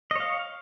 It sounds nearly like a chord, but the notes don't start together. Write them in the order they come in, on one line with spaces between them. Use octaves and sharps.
D#5 C#5 F5